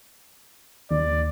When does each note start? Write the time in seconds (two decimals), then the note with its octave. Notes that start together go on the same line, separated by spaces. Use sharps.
0.91 D#2 D5